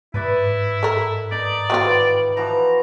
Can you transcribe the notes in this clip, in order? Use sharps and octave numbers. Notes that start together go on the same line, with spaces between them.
G#2 E4 B4 D5 E5
A4 A#4
D#4 D5 D#5 A#5
D#3 E3 F#3 C4 F4
E3 F3 F#4 A#5